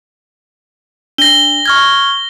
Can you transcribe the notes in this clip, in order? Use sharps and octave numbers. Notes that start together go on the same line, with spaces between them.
D4 A#6 G7
C#6 F6 G#6